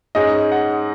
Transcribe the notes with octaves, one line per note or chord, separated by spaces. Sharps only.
G#2 G#3 C#4 D#5
F#5